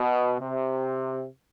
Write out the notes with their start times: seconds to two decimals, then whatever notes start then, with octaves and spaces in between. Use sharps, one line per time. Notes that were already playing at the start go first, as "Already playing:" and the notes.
Already playing: B2
0.39 C3